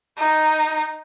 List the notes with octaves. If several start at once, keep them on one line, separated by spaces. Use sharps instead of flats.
D#4